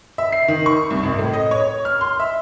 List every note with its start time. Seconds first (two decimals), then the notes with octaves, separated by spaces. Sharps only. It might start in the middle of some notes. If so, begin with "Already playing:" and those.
0.18 E5
0.32 C7
0.48 D#3
0.66 C#6
0.91 C2
1.03 G#1
1.18 A2
1.34 D#5
1.51 C#5
1.85 F6
2.01 C6
2.20 E5